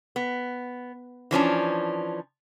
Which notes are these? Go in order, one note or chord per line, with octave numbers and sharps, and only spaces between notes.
B3
E3 F3 C#4 D4